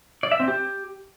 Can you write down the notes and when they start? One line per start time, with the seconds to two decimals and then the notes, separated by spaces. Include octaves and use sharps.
0.23 D5
0.31 E5
0.40 C4
0.48 G4